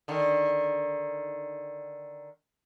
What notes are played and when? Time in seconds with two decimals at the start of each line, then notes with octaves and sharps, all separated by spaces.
0.08 D3 D#3